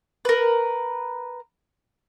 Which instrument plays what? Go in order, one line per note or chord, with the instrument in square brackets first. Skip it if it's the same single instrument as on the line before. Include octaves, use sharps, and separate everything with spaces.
[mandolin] A#4 B4